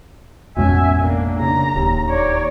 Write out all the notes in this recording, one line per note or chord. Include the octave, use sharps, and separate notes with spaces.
A1 F2 B2 G#3 C#4 E5 G#5
A#3 D4
C#3 D4 A#5
D1 D#2
C#5 D5